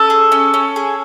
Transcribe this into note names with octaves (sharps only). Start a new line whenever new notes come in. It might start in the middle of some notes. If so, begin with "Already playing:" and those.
Already playing: C#4 A4
G#4
C#4
C#4
G#4